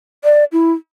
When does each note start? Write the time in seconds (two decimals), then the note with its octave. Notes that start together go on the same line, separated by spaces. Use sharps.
0.24 D5
0.52 E4